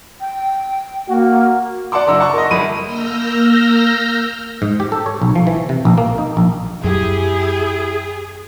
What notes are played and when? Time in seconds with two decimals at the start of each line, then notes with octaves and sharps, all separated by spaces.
0.21 G5
1.09 A#3 F#4
1.92 D5 F#5 A5 C6 D6
2.07 F#1 D4 A#5 E6
2.20 F#5 A5 C6 C#6
2.33 A#4 D#5
2.51 G1 B5 D#7
2.81 A#3 E6 F6 G6 A#6
4.62 G#2
4.80 G4
4.92 A4
5.06 C#5
5.22 B1
5.35 F3
5.47 E3
5.69 C3
5.85 A#1
5.98 A#3
6.18 D#4
6.37 A#1
6.84 F#2 E4 G4 G#4